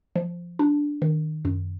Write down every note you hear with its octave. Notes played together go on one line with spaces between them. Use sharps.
F3
D4
D#3
F#2